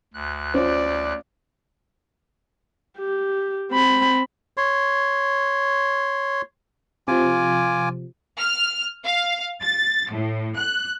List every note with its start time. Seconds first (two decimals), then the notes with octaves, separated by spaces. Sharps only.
0.13 D2 F#6
0.54 C#4 F4 C5 D5
2.99 G4
3.72 C4 B5
4.57 C#5 C6
7.08 C3 F3 F4 G#5 D6
8.38 F6
9.05 F5
9.62 A6
10.10 A2
10.56 F#6